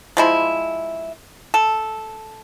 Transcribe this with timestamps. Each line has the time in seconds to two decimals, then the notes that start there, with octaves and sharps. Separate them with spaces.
0.17 F3 G#3 E4
1.54 A4